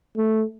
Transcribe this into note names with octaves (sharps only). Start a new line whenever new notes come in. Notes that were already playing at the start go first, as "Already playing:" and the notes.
A3